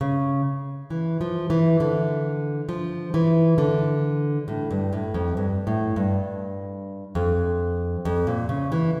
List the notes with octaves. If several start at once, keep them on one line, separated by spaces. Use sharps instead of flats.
C#3
E3
F3
E3
D3
F3
E3
D3
A2
G2
A2
F2
G2
A2
G2
F2
F2
A#2
C#3
E3